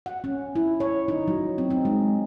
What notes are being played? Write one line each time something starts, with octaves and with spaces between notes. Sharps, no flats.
F#5
C#4
E4
C#5
D#4
F#3
C4
D#4
G#3